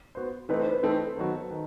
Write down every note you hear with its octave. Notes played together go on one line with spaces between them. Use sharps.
B3 F#4 C5
E3 A3 C4 D#4 B4
C5
B4
E3 A3 C4 D#4 A4
D#3 F#3 B3 F#4
D#3